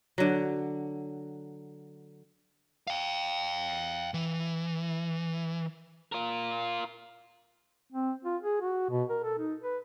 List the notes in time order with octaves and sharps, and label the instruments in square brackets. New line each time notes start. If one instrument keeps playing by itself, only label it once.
[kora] D3 F#3
[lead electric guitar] F5 G5
E3
F4 A#4
[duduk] C4
F4
G#4
F#4
B2
A#4
A4
D#4
B4